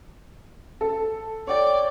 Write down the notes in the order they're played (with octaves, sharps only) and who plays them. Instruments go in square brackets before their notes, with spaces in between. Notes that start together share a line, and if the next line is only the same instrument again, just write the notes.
[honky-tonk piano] A4
[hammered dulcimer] C#5 G5 [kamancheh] D5